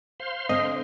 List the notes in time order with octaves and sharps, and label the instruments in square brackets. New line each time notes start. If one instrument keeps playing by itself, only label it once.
[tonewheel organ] C5 F5 C6
[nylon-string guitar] D3 C4 D4 [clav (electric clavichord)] D#5